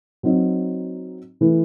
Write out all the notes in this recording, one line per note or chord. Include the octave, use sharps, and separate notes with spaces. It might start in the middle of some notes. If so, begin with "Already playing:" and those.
F#3 C4 D#4
E3 A3 E4 B4